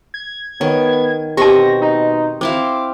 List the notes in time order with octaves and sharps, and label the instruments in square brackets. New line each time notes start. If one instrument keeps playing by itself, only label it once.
[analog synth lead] G#6
[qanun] D#3 [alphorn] B3 [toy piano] C#5
[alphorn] B2 [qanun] C4 C#6 [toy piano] G4 A5 [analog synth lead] A#6
[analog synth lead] D#4
[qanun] C4 E4 F5 [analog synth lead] D6